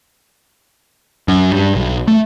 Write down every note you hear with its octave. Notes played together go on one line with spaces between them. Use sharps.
F#2
G2
B1
A3